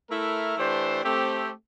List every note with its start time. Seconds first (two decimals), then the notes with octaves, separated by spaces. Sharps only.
0.10 A3 E4 A#4
0.57 E3 A3 D4 G4 C5
1.04 A3 C4 G4